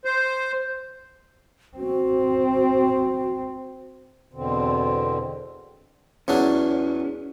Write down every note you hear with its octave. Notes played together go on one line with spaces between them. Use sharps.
C5
C4 F#4
E2 B2 D3 C4
E2 F#3 C#4 D4